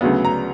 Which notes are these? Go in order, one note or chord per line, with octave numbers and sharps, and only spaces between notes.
D2 C#3 F#3 B3
A#5